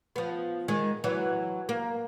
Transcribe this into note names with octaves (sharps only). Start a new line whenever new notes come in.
F3 B3
D#3 G#3
E3 F#3
A#3